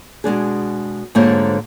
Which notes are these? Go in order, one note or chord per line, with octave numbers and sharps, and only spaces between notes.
B2 G#3 D4 G#4
G#2 D3 A#3 F4 C5 C#5